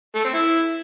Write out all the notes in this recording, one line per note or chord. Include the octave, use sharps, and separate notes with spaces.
A3
C4
E4